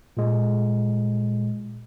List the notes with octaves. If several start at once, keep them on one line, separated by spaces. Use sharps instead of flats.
A#2 G#3